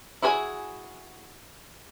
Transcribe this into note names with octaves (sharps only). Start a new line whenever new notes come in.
E4 F#4 G#4 B4 G#5